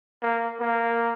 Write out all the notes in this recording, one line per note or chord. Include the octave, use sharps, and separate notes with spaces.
A#3
A#3